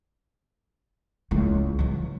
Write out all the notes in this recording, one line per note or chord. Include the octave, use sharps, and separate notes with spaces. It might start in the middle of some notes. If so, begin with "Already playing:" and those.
C#2 E4
E3 F#3